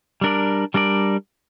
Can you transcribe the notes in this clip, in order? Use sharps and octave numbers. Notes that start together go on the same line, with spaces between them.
G3 D4 A#4 D5
G3 D4 A#4 D5